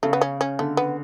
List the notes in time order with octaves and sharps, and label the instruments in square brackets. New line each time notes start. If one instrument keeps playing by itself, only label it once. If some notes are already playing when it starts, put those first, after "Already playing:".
[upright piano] C#3 [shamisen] A3
[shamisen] B3
C#4
C#4
[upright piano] D3 [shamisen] A3
[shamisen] B3